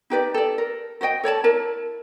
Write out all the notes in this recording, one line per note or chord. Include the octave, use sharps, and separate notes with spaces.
D#4 G4 B4 D5
A4 D5
A#4
F#4 C5 D#5 G5
A4 C#5 D5 A5
E4 A#4 A5